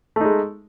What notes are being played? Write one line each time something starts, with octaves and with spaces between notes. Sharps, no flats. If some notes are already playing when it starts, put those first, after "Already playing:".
G#3 A3 D#4